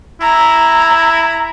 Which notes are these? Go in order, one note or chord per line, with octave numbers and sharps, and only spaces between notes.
E4 A#5